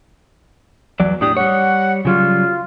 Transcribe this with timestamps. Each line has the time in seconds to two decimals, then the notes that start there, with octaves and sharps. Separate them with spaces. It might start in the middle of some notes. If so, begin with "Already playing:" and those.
1.00 E2 F#3 D5
1.21 A2 D4 G4 D#6
1.37 G3 C#5 F#5
2.05 C#3 F#3 G3 F4